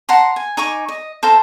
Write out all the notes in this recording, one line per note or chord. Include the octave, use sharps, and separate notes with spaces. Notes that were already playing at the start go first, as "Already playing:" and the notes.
F#5 A5 A#5 C6
G#5
D#4 G#5 C#6 D6
D#5
A4 C5 F5 A#5